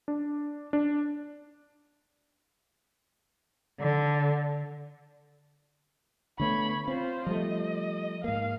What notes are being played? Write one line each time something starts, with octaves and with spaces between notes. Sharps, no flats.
D4
D4
D3
D3 A3 B3 C#5 B5
C4 F4 C5
F3 G3 A3 D#5
G#2 A#3 F5